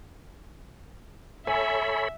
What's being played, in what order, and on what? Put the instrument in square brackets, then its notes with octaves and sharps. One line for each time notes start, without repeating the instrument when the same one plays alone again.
[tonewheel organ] A4 C#5 B5 [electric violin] E5 [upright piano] G#5